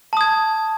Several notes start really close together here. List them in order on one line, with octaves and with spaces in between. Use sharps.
A5 D#6 G#6